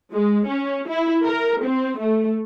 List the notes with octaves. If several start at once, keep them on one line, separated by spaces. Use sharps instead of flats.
G#3
C#4
E4
A#4
C4
A3